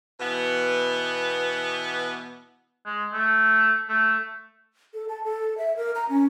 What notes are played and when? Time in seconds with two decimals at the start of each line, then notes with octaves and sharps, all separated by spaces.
0.20 B2 E3 B3
2.86 G#3
3.13 A3
3.89 A3
4.94 A4
5.09 A5
5.24 A4
5.58 E5
5.77 A#4
5.95 A#5
6.09 C#4